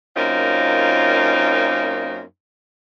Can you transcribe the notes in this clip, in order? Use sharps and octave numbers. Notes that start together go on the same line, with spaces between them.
F#2 A#3 C4 C#4 D#4 F4